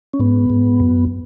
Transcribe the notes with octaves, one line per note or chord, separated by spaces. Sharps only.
C#4
G#2 B3
G#2
F#2